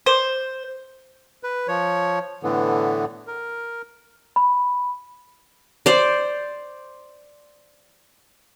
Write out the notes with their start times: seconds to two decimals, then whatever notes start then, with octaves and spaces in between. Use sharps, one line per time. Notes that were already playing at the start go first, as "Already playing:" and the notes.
0.06 C5
1.43 B4
1.68 F3 C#5
2.43 A2 D3 E3 B3
3.27 A#4
4.36 B5
5.86 C5 D5